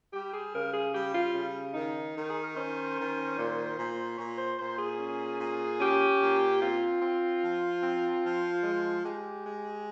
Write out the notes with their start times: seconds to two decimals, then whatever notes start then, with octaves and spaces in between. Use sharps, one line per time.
0.13 G3 G4
0.33 G#4
0.53 C#3 A#4
0.74 G#4
0.93 G3 G4
1.15 F4
1.34 C#3
1.74 D#3 D#4
2.15 D#3
2.28 G#4
2.42 A#4
2.55 C#4 C5
2.96 D#3
3.37 A#2
3.76 A#2
4.18 A#2 C#5
4.37 C5
4.58 A#2 C5
4.78 G#4
4.98 C#4
5.39 A#2
5.79 C#4 G4
6.20 A#2
6.60 C4 F4
7.01 C4
7.41 F3
7.82 C4
8.23 F3
8.63 G#3
9.04 G#3 G4
9.44 G#3